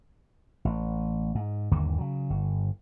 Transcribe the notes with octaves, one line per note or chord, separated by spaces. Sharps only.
A1
G#2
G1 D#2 D3 A#3
C#3 F#3
G1